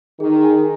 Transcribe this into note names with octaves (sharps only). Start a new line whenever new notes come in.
D#3 G#4
G#5